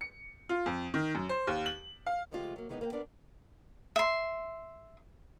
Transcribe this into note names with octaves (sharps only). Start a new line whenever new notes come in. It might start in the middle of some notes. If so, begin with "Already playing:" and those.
C#7
F4
F2
D#3
F#2
C5
D#2
F#7
F5
C#3 F3 G#3 A3 F4 G4
F#3 A#3
D#3 E3 G#3 A#3 B3 D#4
A#3 B4 G5
B3 D4 A#4 D5
E5 C6